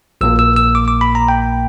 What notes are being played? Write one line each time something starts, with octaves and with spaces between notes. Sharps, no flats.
A#1 A#2 A#3 E6
E6
E6
D6
D6
B5
A#5
G5